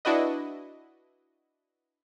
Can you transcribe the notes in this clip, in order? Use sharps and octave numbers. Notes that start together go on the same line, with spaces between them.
D4 E4 F#4 B4 D#5